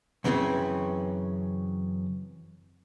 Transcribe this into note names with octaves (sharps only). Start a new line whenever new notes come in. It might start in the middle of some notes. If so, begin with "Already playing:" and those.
F#2 C#3 E3 A#3 C4 C#4